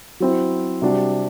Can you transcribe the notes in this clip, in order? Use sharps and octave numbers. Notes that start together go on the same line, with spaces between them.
F#3 C4 E4
C3 G3 D4 F#4